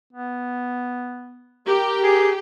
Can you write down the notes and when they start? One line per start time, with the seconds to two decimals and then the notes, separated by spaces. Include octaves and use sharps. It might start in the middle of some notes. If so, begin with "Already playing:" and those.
0.13 B3
1.67 G4 A#4
2.04 G#4